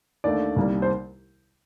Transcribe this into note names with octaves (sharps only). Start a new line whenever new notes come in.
D#2 D3 A3 D5
C2 C3 D#3 G3 A#3
C5